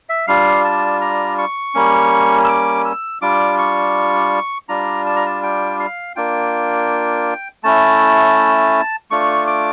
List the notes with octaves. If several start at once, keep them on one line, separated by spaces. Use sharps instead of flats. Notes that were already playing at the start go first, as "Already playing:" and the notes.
E5
G3 D4 F4 F5
A5
A#5
C#6
G3 A#3 C#4
E6
D6
E6
G3 D4 F4 D6
C#6
G3 D4 F4 A#5
A5
A#5
A5
G5
F5
A#3 D4 F4 G5
A3 C#4 E4 A5
A3 D4 F4 C#6
D6